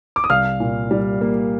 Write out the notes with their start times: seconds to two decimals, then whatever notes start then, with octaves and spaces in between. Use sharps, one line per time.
0.16 D6
0.24 D#6
0.30 C2 F5 F6
0.60 A#2
0.91 G3
1.21 A#3